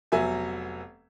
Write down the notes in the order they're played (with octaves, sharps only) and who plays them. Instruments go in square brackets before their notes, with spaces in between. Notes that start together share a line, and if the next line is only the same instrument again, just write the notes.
[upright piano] F1 F#3 B3 E5 G#5